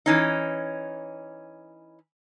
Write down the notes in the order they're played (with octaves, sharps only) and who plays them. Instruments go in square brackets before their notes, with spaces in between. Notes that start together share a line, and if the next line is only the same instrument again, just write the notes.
[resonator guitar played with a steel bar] E3 C#4 D#4